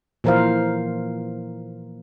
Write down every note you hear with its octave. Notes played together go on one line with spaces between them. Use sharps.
A#2 E3 F3 A#4 C5 F5